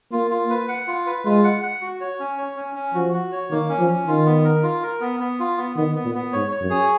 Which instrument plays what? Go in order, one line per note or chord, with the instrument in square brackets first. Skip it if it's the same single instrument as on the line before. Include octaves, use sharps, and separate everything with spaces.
[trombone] A#3 [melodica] F4
[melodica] F4
B4
F#5
F4
B4
[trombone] G#3 [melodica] F4
[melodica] F#5
F#5
F#4
C#5
C#4
C#5
C#4
C#4
[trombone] F3 [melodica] F#4
[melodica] F#4
C#5
[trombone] D#3 [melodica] A#3
[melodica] C#4
[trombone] F3
[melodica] C#4
[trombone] D#3 [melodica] F4
[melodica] B3
A#4
F4
A#4
B3
B3
F4
B3
[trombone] D#3 [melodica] B3
[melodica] B3
[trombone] A#2
[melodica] B3
[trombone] G#2 [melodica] C#5
[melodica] C#5
[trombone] F#2
[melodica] G#4